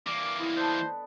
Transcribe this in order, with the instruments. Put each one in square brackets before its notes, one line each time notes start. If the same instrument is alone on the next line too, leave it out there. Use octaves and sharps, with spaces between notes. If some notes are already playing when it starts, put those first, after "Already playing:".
[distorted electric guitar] E3 A#3 [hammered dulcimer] G3 [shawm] D6
[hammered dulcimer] B3 C4 D#5 [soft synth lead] E4
[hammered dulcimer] D4 A4 B4 [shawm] C5